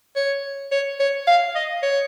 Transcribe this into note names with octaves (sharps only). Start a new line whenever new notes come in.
C#5
C#5
C#5
F5
D#5
C#5